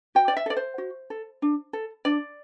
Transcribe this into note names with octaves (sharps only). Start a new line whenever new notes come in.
F#4 G5
D5
E5
A4 D5
C5
F#4
A4
D4
A4
D4 D5